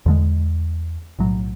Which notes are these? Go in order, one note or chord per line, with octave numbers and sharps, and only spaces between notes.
E2 D3 G#3
B1 A2 F#3